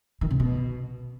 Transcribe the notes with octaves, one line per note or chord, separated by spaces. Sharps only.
D#3
C3
B2